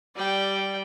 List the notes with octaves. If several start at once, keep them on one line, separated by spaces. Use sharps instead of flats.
G3 D5 G5